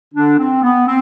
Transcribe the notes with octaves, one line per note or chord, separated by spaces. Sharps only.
D3 D4
C4
B3
C4